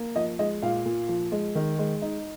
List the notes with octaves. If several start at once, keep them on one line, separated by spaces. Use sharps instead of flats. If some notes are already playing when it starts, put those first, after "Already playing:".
Already playing: A#3
F3 D#5
G#3 D#5
A#2 F5
A#2
F3
G#3
D#3
G#3
D#4